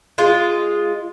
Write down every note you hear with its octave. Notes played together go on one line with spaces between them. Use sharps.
G#3 F4